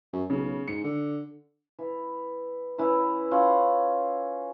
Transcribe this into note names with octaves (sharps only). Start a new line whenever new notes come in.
F#2
B1 C#3
G#2 C#7
D3
E3
E3 C#4 E4
C#4 F4 C#5 F#5